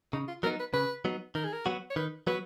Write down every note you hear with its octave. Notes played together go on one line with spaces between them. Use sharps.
C#3 D#4
F4
F#3 B3 D#4 A#4
B4
C#3 B4
F#3 B3 D#4
D#3 A#4
G#4
A#4
F#3 B3 F#4
C#5
D#3 B4
F#3 B3 F#4 B4